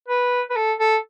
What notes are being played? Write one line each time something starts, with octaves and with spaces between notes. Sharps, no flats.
B4
B4
A4
A4